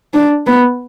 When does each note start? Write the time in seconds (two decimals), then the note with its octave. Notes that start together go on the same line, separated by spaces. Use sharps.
0.14 D4
0.47 B3